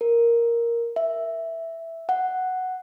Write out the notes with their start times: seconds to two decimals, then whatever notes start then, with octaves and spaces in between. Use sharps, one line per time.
0.01 A#4
0.96 E5
2.09 F#5